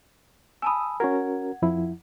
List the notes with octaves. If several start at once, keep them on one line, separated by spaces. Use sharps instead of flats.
G#5 A5 B5 D#6 E6
C#4 F#4 A#4 F#5 G#6
F2 F3 E4